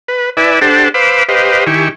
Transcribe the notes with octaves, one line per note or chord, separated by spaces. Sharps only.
B4
E4 B4 D5 E5 G#5
D4 G4 A4 C5 F#5 A5
B4 C5 F5 B5 D6 E6
G4 B4 C5 D#5 F5
D#3 E4 G4 G#5 C#6